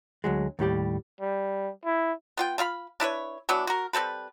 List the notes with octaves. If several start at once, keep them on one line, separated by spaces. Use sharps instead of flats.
D2 F#3 G#3
D#2 A2 G3 G4
G3
E4
B3 F4 G5
A3 F4 F5 B5
D4 E4 B4 C#5
E3 F#3 B3 D4
F#4 A#4
G3 C4 A4 B4